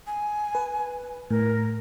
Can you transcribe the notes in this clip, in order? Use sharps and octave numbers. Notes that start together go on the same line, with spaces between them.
G#5
B4
A2 A#4